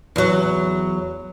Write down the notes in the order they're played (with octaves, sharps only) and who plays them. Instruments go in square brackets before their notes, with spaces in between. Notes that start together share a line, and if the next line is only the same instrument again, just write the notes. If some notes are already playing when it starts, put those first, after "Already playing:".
[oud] E2 F#3